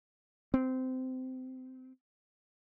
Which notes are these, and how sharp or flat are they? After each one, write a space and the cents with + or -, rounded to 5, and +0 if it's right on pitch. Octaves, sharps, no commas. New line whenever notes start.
C4 -20